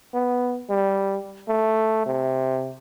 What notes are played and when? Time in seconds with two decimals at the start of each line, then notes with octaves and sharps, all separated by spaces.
0.14 B3
0.70 G3
1.48 A3
2.06 C3